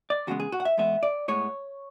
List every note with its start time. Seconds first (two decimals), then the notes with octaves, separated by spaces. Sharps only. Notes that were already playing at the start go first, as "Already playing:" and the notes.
0.10 D5
0.27 E2 C#3 G#3 B3 F#4
0.40 G#4
0.52 F#4
0.60 F#5
0.65 E5
0.77 G#2 E3 G#3 B3 E5
1.03 D5
1.28 A2 G#3 B3 C#5